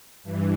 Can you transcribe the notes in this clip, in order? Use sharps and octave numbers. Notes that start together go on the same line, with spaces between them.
G2 E3